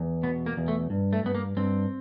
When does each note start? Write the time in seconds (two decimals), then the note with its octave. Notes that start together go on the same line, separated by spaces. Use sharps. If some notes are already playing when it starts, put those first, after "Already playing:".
Already playing: E2
0.23 B2 B3
0.46 A#3
0.57 E2
0.68 A3
0.90 G2
1.13 A3
1.23 G2 B3
1.35 A#3
1.57 G2 C4